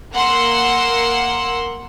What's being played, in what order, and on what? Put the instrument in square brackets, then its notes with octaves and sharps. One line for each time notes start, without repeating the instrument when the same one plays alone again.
[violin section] A#3 F#5 C6 E6